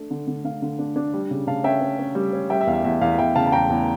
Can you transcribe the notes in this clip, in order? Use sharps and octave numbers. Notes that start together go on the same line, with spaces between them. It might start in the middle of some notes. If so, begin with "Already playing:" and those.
Already playing: A3 D4
D3
D3
D3 F5
D3
D4
D4
G3
C#3
C#3 F5 A5
C#4 E5 G5
C#4
C#4
G3
C#4
G3 E5 G5
E5
E2 F5
E5
E2 E5
E2 F5
E2 E5 G5
C#3 F5 A5
A5
E2 G5 A#5
E2